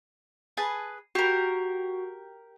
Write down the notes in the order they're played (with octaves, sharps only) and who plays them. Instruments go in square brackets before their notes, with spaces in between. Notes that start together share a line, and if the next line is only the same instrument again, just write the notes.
[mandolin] G#4 B4 A5
[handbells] F#4 [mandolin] G4 A#4